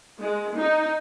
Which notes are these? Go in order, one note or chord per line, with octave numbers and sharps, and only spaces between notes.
G#3
D#4